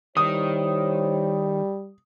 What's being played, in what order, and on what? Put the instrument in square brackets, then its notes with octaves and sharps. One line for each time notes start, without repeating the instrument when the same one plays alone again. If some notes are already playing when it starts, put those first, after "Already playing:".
[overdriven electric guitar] D#3 [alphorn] G3 [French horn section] E4 C5 C#5 [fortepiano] D#6